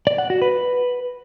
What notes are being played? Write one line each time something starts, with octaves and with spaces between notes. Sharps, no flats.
D5
F#5
F#4
B4